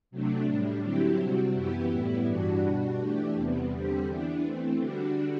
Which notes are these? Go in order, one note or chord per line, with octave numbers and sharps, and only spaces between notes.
C3 F#3 A3 D4
A2 G3 D4
D3 F#3 C4 E4 G4
C3 G3 C4 F#4
F#2 E3 B3 E4 G4
A2 G3 B3 E4
G2 E3 G3 D4 F#4
B2 G3 D4 F#4
E3 A3 D4 G4
E2 C3 G3 B3
E2 D3 G3 C4 G4
E3 B3 D4
E3 A3 C4
D3 G3 D4 F#4